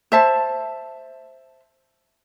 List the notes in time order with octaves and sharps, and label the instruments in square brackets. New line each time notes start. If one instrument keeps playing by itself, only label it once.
[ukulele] C5 E5 A5